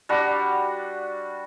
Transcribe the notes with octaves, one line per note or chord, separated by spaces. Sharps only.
G3 D4 F#4